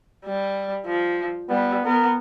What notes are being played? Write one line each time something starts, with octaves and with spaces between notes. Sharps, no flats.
G3
F3
G3 B3
B3 A#4